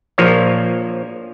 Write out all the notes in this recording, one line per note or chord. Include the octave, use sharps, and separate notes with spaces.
A#1 F3 A#3 C#5